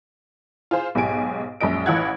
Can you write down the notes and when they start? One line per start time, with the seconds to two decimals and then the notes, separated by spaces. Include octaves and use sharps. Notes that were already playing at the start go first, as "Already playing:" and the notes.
0.71 F4 G#4 C5
0.95 B1 G#2 G4 G#5 D7
1.61 A#1 F#2 G#3 D#5 D7
1.86 A1 E4 F4 F#5 F#6 G#6